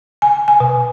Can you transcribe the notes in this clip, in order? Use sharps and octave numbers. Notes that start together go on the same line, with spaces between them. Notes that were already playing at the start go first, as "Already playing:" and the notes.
G#5
G#5
B2